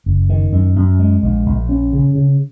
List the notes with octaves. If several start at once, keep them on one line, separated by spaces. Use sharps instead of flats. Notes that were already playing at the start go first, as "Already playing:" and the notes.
F#1
D#3
F#2
F#2
G#3
A#1
A#1
C#4
C#3
C#3